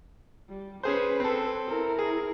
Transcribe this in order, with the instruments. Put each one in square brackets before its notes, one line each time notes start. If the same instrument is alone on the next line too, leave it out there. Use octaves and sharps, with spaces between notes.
[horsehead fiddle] G3
[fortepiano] C#4 G#4 C5 [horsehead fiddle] B4
[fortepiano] C4 A4
[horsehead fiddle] E4 A#4
[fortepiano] G#4